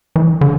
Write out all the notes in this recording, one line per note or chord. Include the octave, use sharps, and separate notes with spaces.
E3
D3